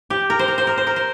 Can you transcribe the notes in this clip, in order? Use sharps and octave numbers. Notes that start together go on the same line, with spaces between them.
G4
A#4
C5
A#4
C5
A#4
C5
A#4
C5